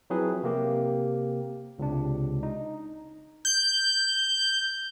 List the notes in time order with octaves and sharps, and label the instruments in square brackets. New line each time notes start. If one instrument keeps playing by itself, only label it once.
[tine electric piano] F3 F#3 C4 E4 G#4 B4
C3 A#3 G4
C#2 C3 D4
D#4
[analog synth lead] G6